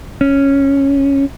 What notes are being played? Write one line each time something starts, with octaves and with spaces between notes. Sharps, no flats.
C#4